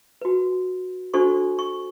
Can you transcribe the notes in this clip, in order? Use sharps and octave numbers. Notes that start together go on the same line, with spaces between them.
F#4 B4
D4 F#4 A4 C5 C#6
C#6